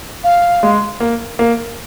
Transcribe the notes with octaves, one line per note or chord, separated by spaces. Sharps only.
F5
G#3
A#3
A#3